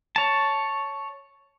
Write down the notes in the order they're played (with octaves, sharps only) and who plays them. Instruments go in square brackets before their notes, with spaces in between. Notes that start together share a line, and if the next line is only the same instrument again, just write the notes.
[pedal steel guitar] C#5 A5